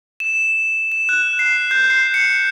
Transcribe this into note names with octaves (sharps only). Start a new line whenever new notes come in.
E7
E7
F#6
C7
G6
C7
C#7